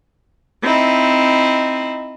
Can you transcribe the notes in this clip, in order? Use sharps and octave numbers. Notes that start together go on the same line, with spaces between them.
C4 D#4 E4